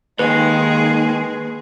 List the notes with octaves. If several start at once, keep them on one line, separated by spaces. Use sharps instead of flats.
D#2 D#3 G#3 G#4 B4